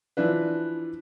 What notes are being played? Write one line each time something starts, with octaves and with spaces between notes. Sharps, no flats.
E3 F3 D4 B4